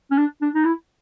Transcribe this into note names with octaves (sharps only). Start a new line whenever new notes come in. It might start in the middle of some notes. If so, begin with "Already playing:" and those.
C#4
D4
D4
D#4
E4